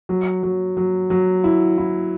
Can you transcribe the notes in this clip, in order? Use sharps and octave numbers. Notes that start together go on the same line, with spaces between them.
F#3
F#3
F#3
F#3
E4
E4